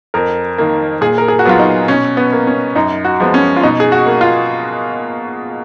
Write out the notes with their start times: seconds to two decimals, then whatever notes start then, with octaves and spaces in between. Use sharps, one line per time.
0.14 F2 A#4
0.58 D#3 A#3
1.01 A#2 G#4
1.18 A#4
1.28 G#4
1.39 F#4
1.45 F#3 B3 F4
1.59 D#4
1.88 B2 C#4
2.17 B3
2.32 A#3
2.47 C#4
2.76 F#2 D#4
3.04 F#4
3.20 F3 G#3 B3
3.34 C#4
3.56 F4
3.63 B2 D#4
3.80 G#4
3.92 F#4
4.06 A#3
4.21 F4